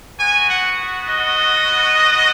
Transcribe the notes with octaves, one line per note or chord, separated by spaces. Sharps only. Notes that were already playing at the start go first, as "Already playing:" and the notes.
B3 F#4 G#5
F#5
D#5